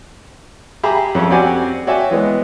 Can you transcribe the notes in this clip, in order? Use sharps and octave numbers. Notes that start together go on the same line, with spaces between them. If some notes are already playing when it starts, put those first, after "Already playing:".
G4 G#4 E5 A#5 B5
F2 C#4 A4
C4 F#4 G4 D5 F#5 G#5
F#4 C#5 D5 E5 G5 G#5
E3 G#3 B3